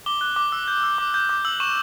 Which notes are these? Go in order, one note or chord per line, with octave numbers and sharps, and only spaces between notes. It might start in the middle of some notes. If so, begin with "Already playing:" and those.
D6 G7
F#6
D6
E6
G6
E6
D6
G6
D6
E6 F#7
C#6 E7